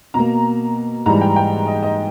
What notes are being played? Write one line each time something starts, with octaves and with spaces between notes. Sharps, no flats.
B2 A#3 A#5
G#2 E3 G3 A#5
G5
G5
D#5
D#5